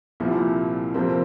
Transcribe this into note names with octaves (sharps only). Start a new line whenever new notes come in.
C2 A#2 F3 E4
F2 C3 F3 A#3 C4